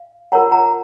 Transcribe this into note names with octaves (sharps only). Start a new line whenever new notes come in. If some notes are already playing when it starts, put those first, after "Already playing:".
Already playing: F5
F4 A#4 C#5 F#5 A#5
F#5 A#5